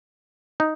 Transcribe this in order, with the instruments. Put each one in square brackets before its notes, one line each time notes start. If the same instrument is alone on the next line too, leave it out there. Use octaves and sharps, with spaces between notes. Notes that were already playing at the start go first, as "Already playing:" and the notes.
[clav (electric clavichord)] D#4